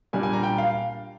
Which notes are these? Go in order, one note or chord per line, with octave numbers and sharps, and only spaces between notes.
A#2 G3 A#3 D4 G#5
G#5
A#5
G5
F5